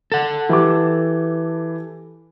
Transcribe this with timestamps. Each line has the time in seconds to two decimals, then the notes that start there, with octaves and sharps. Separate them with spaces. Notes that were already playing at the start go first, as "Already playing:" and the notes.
0.12 A4 F#5
0.49 E3 G4 D6